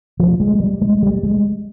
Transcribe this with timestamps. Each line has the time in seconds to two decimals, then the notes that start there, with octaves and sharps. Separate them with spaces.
0.20 F3
0.40 G#3
0.60 G3
0.82 G#3
1.03 G3
1.23 G#3